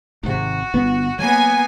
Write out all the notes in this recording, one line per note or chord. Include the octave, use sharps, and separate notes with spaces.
G#1 C3 F#4
G1 B3
F#3 A#3 B3 G#5